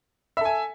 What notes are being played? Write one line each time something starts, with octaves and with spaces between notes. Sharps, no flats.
A4 E5 G#5